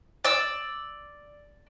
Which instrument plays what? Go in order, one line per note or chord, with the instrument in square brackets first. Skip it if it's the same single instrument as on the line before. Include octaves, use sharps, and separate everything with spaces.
[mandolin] D5 E6